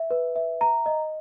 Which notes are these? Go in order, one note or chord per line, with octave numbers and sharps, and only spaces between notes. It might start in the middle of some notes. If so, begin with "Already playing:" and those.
Already playing: E5
B4
E5
A#5
D#5